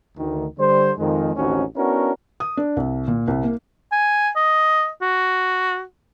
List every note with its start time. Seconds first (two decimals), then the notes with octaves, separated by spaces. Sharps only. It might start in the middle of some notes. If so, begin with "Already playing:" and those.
0.18 D2 D#3
0.58 D3 G3 C5
0.98 F2 D#3 G#3
1.36 A1 D#2 C4 C#4 D#4 F#4
1.75 B3 C#4 D4 E4 F#4 A#4
2.40 D#6
2.57 D4
2.77 C2
3.08 A#2
3.28 C2
3.43 A#3
3.92 G#5
4.36 D#5
5.02 F#4